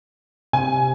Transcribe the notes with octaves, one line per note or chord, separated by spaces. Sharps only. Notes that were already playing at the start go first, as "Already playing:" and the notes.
C3 G#5